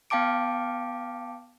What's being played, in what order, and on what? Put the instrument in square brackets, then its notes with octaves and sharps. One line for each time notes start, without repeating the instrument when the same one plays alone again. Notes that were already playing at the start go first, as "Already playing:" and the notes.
[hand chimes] B3 F5 G5 A5 D6 D7